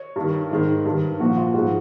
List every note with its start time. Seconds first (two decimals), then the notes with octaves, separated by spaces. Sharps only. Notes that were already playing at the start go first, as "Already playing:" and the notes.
Already playing: C#5
0.16 G2 D#3
0.51 G#2 D#3
0.85 G2 D#3
1.20 A#2 F3 F#4
1.37 F4
1.54 G#2 F3 F#4